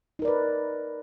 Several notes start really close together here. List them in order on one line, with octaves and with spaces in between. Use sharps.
D#4 A#4 D5 B4